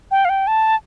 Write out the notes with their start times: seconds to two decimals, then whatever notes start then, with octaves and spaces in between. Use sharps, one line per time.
0.11 G5
0.25 F5
0.29 G5
0.47 A5